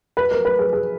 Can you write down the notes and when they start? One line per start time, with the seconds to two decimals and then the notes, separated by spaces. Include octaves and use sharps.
0.17 B4
0.31 A#4
0.45 B4
0.59 G#4
0.73 G#4